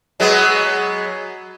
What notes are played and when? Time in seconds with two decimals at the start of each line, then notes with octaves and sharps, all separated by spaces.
0.20 F#3 G#3 B3